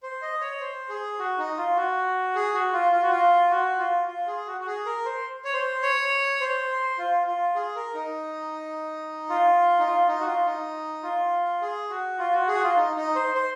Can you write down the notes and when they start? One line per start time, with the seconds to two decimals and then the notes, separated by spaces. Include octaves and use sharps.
0.03 C5
0.22 D#5
0.41 C#5
0.60 C5
0.89 G#4
1.19 F#4
1.38 D#4
1.57 F4
1.76 F#4
2.35 G#4
2.54 F#4
2.73 F4
2.92 F4
3.02 F#4
3.11 F4
3.50 F#4
3.79 F4
4.08 F4
4.27 G#4
4.47 F#4
4.61 F#4
4.67 G#4
4.86 A#4
5.05 C5
5.44 C#5
5.53 C5
5.83 C#5
6.40 C5
6.98 F4
7.27 F4
7.55 G#4
7.76 A#4
7.94 D#4
9.29 F4
9.79 D#4
9.87 F4
10.07 D#4
10.21 F#4
10.26 F4
10.46 D#4
11.03 F4
11.62 G#4
11.90 F#4
12.19 F4
12.33 F#4
12.48 G#4
12.55 F#4
12.63 F4
12.76 D#4
12.96 D#4
13.15 C5
13.35 C5